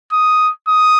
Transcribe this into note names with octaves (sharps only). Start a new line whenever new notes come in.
D#6
D#6